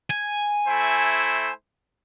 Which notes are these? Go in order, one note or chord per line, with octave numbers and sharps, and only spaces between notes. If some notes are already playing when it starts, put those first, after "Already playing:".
G#5
A3 E4 C5